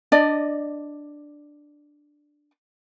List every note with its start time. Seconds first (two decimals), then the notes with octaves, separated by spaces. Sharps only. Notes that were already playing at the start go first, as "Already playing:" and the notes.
0.12 D4 D5 D#5